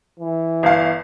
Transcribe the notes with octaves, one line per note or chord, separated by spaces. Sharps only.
E3
G1 F5